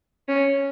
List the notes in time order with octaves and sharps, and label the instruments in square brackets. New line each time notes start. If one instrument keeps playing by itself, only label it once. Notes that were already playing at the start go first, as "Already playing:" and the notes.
[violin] C#4